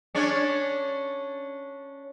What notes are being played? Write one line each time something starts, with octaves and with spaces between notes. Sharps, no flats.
C#4 D4 C#5